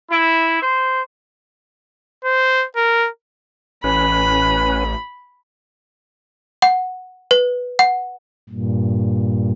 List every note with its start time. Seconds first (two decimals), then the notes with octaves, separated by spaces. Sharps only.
0.11 E4
0.62 C5
2.25 C5
2.76 A#4
3.84 A1 C#4 B4 B5
6.62 F#5
7.31 B4
7.79 F#5
8.49 G2 A#2